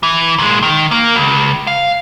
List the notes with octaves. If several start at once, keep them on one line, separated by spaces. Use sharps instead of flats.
E3
A#2 G#3
D#3
A#3 A#4
C#2
F5